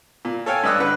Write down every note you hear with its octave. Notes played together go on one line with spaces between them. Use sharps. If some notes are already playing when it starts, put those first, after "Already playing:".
A#2
A4 C#5 F5 G5 G#5
G2 D5 D#5 E6 F#6
D3 B4 F#5